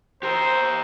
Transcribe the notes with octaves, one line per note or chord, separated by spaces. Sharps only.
G4 A#4 C5